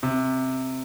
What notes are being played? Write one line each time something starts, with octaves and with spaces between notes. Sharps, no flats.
C3